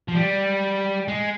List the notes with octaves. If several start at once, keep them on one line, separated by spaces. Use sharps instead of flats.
F3
G3
G#3